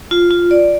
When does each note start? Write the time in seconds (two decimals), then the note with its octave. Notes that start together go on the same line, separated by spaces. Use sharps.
0.11 F4
0.31 F4
0.51 D5